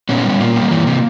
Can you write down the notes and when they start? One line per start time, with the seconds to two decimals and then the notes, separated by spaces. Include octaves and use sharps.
0.09 A#2 B3 C#4
0.25 G3
0.40 A#2 A#3
0.56 G3
0.71 E3
0.87 C3